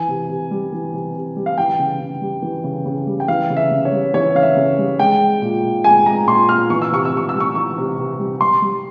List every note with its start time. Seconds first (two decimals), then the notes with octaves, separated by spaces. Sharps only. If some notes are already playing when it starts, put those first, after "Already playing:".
Already playing: E3 G#5
0.08 C3
0.29 C3
0.51 G3
0.72 E3
0.93 C3
1.15 C3
1.36 G3
1.46 F5
1.58 E3 G5
1.79 C#3
2.01 C#3
2.21 G3
2.42 E3
2.64 C#3
2.86 C#3
3.07 G3
3.20 G5
3.28 E3 F5
3.50 C#3
3.57 E5
3.71 C#3
3.85 C#5
3.92 G3
4.14 E3 C#5
4.35 C#3 F5
4.42 E5
4.56 C#3
4.78 G3
4.99 G#3 G5
5.20 G#3
5.42 A#2
5.63 A#2
5.84 G#3 G#5
6.06 G#3 A#5
6.27 A#2 C6
6.48 A#2 F6
6.70 E3 C#6
6.82 E6
6.91 C3 C#6
7.05 E6
7.12 C3 C#6
7.29 G3 E6
7.40 C#6
7.55 E3 C#6
7.77 C3
7.98 C3
8.19 G3
8.41 G3 C6
8.62 G3